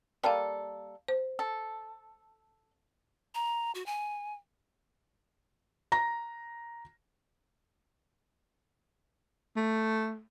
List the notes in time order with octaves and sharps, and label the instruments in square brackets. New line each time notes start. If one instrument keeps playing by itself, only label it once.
[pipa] G3 A#3 A4 [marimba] F5 A5
[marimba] C5
[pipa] A4
[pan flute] A#5
F#4
G#5
[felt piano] A#5 A#6
[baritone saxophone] A3